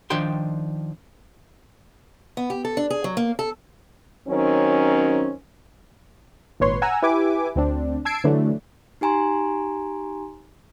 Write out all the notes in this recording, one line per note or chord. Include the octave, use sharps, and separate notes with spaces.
D#3 F3 D4 G5 C6
B3
G4
A4
D4
G#4
F#3
A#3
A4
D#3 F#3 C4 C#4
G#1 A#2 B4 C#5 C6
F#5 G#5 A#5 E6
E4 G4 B4 E5 G#5 D6
D2 C4 D4
A5 E6 G#6 C7 D7
D3 E3 F#3 A3 D4
D#4 G4 G#5 A#5 C6